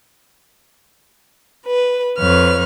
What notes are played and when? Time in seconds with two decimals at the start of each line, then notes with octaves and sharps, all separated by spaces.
1.67 B4
2.19 F2 B4 C#5 F6